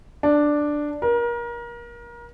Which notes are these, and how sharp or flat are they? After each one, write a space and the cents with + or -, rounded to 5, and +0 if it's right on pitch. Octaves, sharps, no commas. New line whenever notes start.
D4 +5
A#4 +30